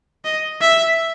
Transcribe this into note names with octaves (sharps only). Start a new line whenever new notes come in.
D#5
E5